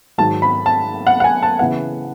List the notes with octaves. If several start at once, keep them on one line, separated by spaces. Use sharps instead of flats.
G#2 D#3 F#3 A5
B5
A5
F#5
F#5
G#5
A5
C#3 E3 B3 F#5